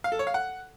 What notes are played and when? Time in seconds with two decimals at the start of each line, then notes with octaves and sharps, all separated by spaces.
0.04 F5
0.12 A4
0.19 C#5
0.27 F5
0.34 F#5